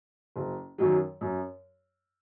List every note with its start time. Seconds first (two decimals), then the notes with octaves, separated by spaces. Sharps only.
0.36 F#1
0.78 F#2 D#3 F#3
1.21 F#2